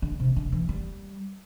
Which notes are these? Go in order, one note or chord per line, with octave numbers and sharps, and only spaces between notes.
D3
C3
D3
E3
G3